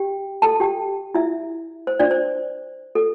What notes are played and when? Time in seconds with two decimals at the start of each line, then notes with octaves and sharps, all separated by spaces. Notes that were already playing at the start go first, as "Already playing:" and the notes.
Already playing: G4 G5
0.42 A4 A5
0.60 G4 G5
1.14 E4 E5
1.87 C5
1.99 D4 D5
2.11 C5
2.95 A4